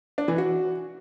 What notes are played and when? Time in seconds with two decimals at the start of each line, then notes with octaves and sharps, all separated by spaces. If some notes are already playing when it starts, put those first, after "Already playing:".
0.18 D4
0.28 E3
0.38 F#4